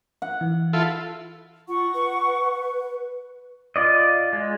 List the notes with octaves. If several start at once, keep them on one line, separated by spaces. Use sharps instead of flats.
F#5
E3
E4 F4 A4
F4 F#5 C#6
B4
F4 D5 D#5
G#3